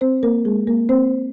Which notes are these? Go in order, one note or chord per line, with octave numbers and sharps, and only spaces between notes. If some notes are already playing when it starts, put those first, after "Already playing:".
C4 C5
A#3 A#4
G#3 G#4
A#3 A#4
C4 C5